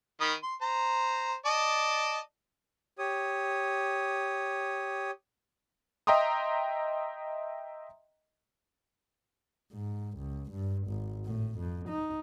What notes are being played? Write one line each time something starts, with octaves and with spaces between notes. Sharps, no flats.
D#3 B5 D#6
C6
C5 A#5
D5 D#5 A5
G4 C#5 D#6
D#5 E5 G5 A#5 C6 D#6
G#2
C#2
G2
G#1
A2
F2
D#4